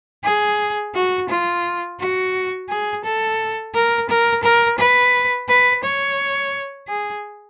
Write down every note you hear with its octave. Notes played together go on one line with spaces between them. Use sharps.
G#4
F#4
F4
F#4
G#4
A4
A#4
A#4
A#4
B4
B4
C#5
G#4